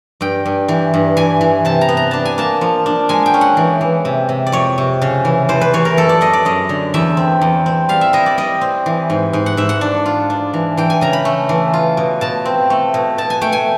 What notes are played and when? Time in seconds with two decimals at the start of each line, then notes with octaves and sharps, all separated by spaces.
0.21 G2 G5
0.45 G2
0.68 E3
0.94 G2
1.17 E3 G#5
1.41 E3
1.65 C3 A5
1.81 A#5
1.89 B3
1.97 A#5
2.11 D4 A5
2.25 G#5
2.38 A#3 A5
2.61 F3
2.86 D4
3.09 G#3 G#5
3.26 G5
3.34 C#4
3.41 F#5
3.57 E3
3.81 E3
4.05 C3
4.29 C3
4.46 D5
4.52 F2 C#5
4.78 C3
5.02 C#3
5.25 E3
5.49 E2 C5
5.61 B4
5.73 E3 C#5
5.85 A#4
5.97 F#2 A4
6.09 D5
6.21 F#2 D#5
6.33 D5
6.45 F#2 D#5
6.69 D3
6.94 E2 E5
7.17 C4
7.41 E2
7.66 C4
7.89 G3 F5
8.01 E5
8.13 E4 D#5
8.26 D5
8.38 G3 D#5
8.61 C4
8.86 E3
9.10 G#2
9.33 G#2
9.46 F#5
9.57 G#2 E5
9.69 F#5
9.81 D4
10.06 F4
10.30 D4
10.54 E3
10.77 E3 G5
10.90 G#5
11.01 C#3 A#5
11.13 B5
11.25 A3
11.49 E3
11.73 F4
11.97 B2
12.21 B2 A5
12.45 C4
12.70 A3
12.94 B2
13.18 B2 A5
13.30 G#5
13.41 A3 G5
13.52 G#5